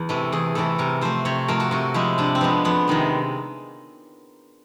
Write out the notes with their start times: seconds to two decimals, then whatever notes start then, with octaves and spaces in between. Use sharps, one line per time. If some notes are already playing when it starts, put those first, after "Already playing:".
Already playing: E2
0.09 C3 E3 A3
0.32 E2 G#4
0.55 C3 E3 A3 A4
0.78 C3 A#4
1.01 F3 A3 C5
1.25 C3 C#5
1.48 F3 A3 A#4
1.60 F#4
1.71 C3 F#4
1.94 F3 G#3 E4
2.18 C3 D4
2.35 C4
2.41 F3 G#3 B3
2.65 F2 B3
2.87 C3 D#3 G#3